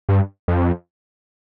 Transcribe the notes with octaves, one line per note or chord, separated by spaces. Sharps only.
G2
F2